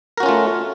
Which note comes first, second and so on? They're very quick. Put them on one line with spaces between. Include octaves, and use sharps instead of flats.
A#4 F#4 C#4 F4 A3